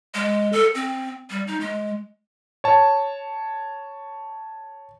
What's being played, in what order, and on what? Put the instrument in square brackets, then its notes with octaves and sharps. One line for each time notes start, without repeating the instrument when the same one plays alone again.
[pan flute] G#3
A4
C4
G3
D#4
G#3
[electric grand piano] C#5 A5